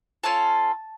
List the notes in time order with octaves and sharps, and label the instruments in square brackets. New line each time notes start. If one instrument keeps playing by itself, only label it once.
[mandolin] C#4 F4 A4 A5